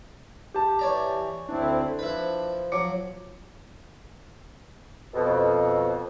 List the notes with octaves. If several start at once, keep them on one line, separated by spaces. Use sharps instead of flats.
G4 A5
E3 C#5 D5 A#5
D2 C4 D4 E4
F3 E4 B4
F3 F#3 D6 C#7
F2 B2